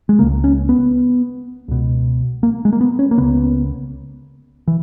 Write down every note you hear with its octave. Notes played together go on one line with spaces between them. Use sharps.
G#3
C#2 C#3 A#3
C#4
B3
C#2 B2
A#3
G#3
A#3
B3
C#4
A#3
C#2 C#3 B3
E3